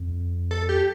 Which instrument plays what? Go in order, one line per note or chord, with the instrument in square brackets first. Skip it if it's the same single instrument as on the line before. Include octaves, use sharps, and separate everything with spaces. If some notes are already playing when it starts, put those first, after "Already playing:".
Already playing: [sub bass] F2
[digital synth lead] A4
G4